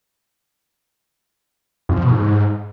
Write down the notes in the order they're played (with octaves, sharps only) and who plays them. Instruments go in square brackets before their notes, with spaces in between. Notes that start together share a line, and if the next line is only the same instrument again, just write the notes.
[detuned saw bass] F2
F3
B2
G#2